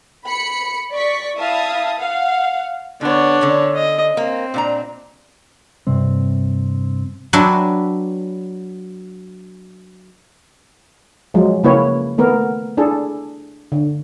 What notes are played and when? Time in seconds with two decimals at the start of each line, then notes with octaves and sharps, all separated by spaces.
0.26 B5 C#7
0.93 D5 C#6 B6
1.37 E4 E5 F5 A5 D#6
1.97 F5 F#5
3.01 D3 B3 D4 C#5
3.41 D3 C#4
3.75 D#5
4.17 A#3 C4
4.54 A#2 D4 A#5
5.87 G2 C3 C4
7.33 F#3 D4 B4 E5 G5 C6
11.34 F3 F#3 G#3
11.64 C#3 A#3 E4 B4 C#5
12.18 D#3 A3 B3 A#4
12.77 D4 E4 G#4 A4
13.72 D3